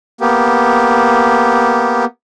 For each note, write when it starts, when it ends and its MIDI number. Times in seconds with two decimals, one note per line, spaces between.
0.21 2.05 58
0.21 2.05 59
0.21 2.05 67